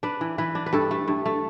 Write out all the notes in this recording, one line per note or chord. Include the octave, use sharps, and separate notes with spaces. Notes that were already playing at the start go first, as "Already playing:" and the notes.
D4 B4
E3
E3 B4
D4
B4
G2 A4
A3
G2
A3